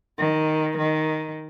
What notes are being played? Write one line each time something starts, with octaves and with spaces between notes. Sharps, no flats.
D#3
D#3